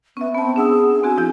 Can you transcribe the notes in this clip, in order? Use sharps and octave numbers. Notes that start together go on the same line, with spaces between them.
B3 C#4 E5
B3 C4 A5
D4 G#4 F#5 E6
C4 F#4 G#4 G#5
F3 E4 G6